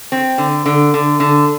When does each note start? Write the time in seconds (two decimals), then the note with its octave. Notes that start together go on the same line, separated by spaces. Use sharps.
0.12 C4
0.38 D3
0.66 D3
0.94 D3
1.20 D3